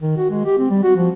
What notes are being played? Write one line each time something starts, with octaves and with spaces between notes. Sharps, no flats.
D#3
F#4
G#3
G4
C4
G3
F#4
F3